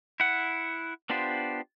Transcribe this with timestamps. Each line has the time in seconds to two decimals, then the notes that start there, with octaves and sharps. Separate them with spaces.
0.20 E4 F#5
1.10 B3 D4 F4 G4 C5